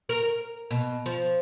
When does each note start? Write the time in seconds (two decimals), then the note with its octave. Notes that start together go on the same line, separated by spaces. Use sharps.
0.09 A#4
0.71 B2
1.06 F3